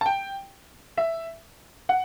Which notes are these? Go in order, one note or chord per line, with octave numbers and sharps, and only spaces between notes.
A5
G5
E5
F#5